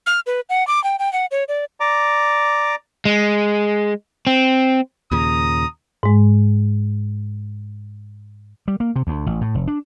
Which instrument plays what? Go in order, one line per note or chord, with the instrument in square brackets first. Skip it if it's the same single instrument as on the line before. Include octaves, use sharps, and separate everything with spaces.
[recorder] F6
B4
F#5
D6
G5
G5
F#5
C#5
D5
[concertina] D5 A#5 D6
[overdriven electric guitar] G#3
C4
[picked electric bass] D#2 A#2 C#3 [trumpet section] A#5 D#6
[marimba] G#2 G#3
[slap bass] G3
A#3
C3
D2
A1
A2
F1
D4